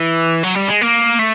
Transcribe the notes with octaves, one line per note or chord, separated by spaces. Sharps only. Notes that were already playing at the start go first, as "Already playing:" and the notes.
Already playing: E3
F#3
G3
G#3
A#3
A3